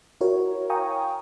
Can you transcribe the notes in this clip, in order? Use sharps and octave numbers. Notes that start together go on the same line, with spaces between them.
E4 F#4 A#4 C#5
F5 G5 G#5 A#5 C#6 D#6